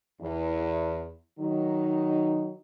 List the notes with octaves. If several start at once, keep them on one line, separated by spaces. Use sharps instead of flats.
E2
D#3 F#3 D#4